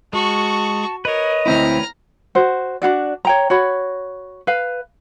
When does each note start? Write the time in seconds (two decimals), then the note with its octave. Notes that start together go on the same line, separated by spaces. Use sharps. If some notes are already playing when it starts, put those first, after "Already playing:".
0.13 G#3 F#4 A5 C#6
1.05 A#4 B4 C#5 D#5
1.46 D2 C4 E4 A#5 F6
2.35 F#4 C5
2.82 D4 F4 F#4 D5
3.25 C#5 G5 A#5
3.50 F#4 C#5 B5
4.47 B4 F5